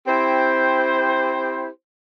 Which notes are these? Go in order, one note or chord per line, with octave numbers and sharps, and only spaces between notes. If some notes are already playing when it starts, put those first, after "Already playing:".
C4 E4 G4 C5